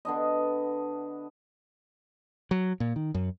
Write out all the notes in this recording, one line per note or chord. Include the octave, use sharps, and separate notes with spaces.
D3 B3 D4 D#5
F#3
A#2
D#3
F#2